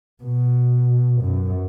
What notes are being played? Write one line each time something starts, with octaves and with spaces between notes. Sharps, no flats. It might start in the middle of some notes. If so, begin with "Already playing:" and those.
B2
F#2